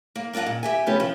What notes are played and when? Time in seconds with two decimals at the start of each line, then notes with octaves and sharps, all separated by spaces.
0.16 A#3
0.33 A#3 D4 F4 D#5 F#5
0.46 A#2
0.63 G4 E5 G#5
0.86 C3 F3 A3 B3 C#4 G4
1.00 F3